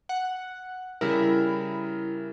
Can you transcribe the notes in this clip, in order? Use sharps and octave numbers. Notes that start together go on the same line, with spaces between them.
F#5
C#3 G3 E4 A#4